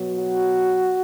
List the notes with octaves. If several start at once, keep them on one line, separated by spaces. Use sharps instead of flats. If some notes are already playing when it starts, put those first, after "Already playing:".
Already playing: B2 F#3
F#4